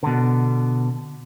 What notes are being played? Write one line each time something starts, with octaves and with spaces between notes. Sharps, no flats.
B2 D3